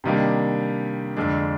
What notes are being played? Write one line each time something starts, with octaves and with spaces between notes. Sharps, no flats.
C3 D#3 G3 A#3 D4
F2 D3 G#3 D4